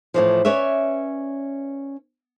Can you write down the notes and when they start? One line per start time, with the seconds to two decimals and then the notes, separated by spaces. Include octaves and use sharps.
0.14 A2 E3 F3
0.45 C#4 B4 C#5 D5 E5